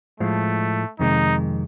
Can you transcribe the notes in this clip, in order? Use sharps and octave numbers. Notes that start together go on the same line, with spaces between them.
A2 F3 G#3 A3
F2 C3 D#3 G#3 D#4